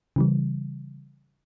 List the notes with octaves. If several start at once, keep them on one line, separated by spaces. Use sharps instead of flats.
C#3 E3 G3